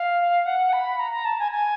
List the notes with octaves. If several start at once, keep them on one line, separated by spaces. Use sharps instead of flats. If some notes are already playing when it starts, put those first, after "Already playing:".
Already playing: F5
F#5
B5
A#5
A#5
A5
G#5
G#5